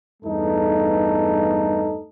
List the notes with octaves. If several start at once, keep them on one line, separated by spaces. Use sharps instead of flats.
E2 G2 A3 D#4 A4